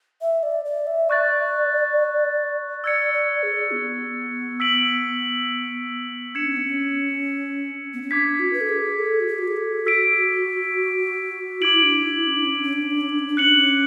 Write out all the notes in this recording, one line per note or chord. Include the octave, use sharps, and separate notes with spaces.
E5
D5
D5
E5
D5 C#6 F#6 A6
D5 E6 G#6 C#7
D5
G#4
B3
E6 B6 D7 F#7
D4 G#6 C#7 E7
C#4
B3
C#4
B3
C#4
D4 D6 G#6 B6
F#4
B4
A4
G#4
A4
F#4
G#4
F#4
G#4
A4
F#4 E6 B6 D7
E4 D6 G#6 D7 F#7
E4
D4
E4
C#4
D4
C#4
D4
C#4
D4
C#4
D4
C#4
D4
C#4
D4
C#4 F#6 C#7 F#7
D4
C#4